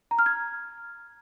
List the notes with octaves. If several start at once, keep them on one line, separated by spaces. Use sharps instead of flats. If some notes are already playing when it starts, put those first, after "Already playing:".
A#5
F6
G#6